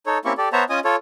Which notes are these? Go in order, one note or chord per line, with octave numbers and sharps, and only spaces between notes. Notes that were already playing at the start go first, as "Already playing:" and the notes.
D#4 A4 C#5
A#3 C4 C#4 E4 G4 C#6
G4 A4 D5
B3 C5 C#5 E5 A5 A#5
C#4 F4 D#5 G#5 D#6
F4 A4 C#5